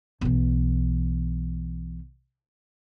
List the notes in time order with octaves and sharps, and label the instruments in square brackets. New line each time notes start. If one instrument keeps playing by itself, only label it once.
[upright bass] B1 E3